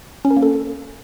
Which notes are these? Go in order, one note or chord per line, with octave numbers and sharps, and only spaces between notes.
C#4
A#4
A#3
A4